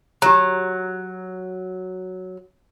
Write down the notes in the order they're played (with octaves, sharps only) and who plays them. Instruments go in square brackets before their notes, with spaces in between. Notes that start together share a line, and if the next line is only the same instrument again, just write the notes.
[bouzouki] F#3 [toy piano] G4 A#5